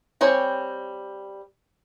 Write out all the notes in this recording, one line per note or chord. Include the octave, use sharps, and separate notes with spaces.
G3 C4 C#5 G#5